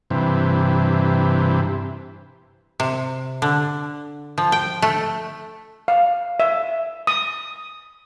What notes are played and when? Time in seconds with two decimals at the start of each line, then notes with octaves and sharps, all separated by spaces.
0.10 G2 C3 E3
2.80 C3
3.42 D3
4.38 F3
4.52 G5
4.82 A3
5.88 F5
6.40 E5
7.07 D#6